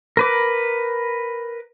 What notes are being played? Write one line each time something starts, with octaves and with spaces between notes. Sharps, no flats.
A#4 B4 D6